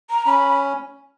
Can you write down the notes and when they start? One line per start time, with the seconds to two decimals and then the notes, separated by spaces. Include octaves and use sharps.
0.10 A#5
0.26 C#4 B5